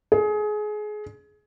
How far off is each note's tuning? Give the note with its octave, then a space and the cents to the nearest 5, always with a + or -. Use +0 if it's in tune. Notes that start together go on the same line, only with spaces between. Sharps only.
G#4 +25